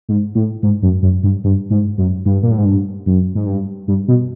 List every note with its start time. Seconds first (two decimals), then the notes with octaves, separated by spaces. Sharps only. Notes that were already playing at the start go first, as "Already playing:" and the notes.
0.09 G#2
0.35 A2
0.63 G#2
0.83 F#2
1.03 F#2
1.23 G2
1.44 G2
1.70 G#2
1.98 F#2
2.26 G2
2.43 A#2
2.51 A2
2.58 G#2
2.65 G2
3.06 F#2
3.35 G#2
3.46 G2
3.88 G2
4.08 B2